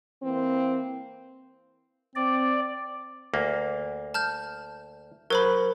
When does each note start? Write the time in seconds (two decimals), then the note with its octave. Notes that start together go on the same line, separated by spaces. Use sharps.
0.23 E3 A#3 C4
2.15 C4 D5
3.34 D2 A#3
4.14 A5 F6 G6
5.30 F#3 A#4 C5 B5